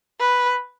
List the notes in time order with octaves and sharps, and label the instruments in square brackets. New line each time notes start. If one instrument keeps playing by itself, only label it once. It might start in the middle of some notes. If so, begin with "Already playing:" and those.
[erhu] B4